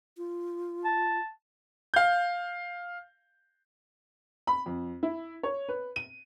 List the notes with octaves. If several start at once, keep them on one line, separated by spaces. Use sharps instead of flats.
F4
A5
F5 G6
B5
F2
E4
C#5
B4
D#7